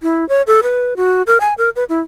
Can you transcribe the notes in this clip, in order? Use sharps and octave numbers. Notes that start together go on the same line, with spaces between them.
E4
C#5
A4
B4
F#4
A#4
G#5
A#4
B4
E4